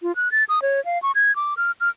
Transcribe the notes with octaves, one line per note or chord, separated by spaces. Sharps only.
F4
F#6
A6
D#6
C#5
F5
C#6
G#6
D6
F6
F6